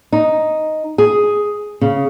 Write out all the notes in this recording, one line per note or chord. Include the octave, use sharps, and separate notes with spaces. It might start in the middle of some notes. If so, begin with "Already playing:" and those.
D#4
G#4
C#3